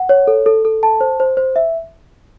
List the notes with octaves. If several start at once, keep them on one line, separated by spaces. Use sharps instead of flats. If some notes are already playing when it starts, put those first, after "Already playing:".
Already playing: F#5
C#5
A4
A4
A4
A5
C5
C5
C5
E5